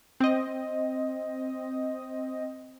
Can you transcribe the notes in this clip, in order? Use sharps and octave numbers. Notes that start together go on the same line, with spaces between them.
C4 D#5